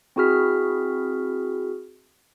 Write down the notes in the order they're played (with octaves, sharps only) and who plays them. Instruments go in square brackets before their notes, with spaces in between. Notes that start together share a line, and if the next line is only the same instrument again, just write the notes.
[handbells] C4 E4 F#4 G#4 F6 B6